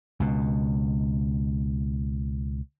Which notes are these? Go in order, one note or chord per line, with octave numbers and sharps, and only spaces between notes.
C#2 B2